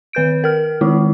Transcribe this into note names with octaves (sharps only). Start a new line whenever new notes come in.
D#3 B4 G6 D7
A#4 F6
D#3 G#3 D#4 E4